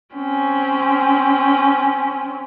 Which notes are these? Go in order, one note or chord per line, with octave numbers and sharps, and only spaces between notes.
C4 C#4